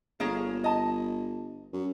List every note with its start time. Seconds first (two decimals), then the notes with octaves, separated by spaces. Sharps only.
0.20 G1 A#3 G#4 C#5
0.64 D#5 A5
1.73 F#2